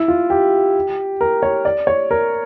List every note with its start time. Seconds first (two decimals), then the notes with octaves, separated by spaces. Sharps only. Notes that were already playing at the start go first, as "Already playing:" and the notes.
Already playing: E4
0.08 F4
0.30 G4
1.21 A#4
1.43 C#5
1.65 D5
1.87 C#5
2.11 A#4